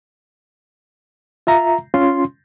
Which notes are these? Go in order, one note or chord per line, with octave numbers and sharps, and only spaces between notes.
F4 E5 A#5
C#4 F4 C6